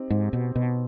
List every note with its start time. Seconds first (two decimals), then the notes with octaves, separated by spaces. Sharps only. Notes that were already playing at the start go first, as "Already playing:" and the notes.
Already playing: C4 D#4 G4
0.10 G#2
0.33 B2
0.56 B2